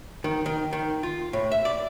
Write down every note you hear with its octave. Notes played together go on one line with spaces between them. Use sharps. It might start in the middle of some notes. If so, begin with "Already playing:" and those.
D#3
D#3
D#3
F4
A2
E5
D5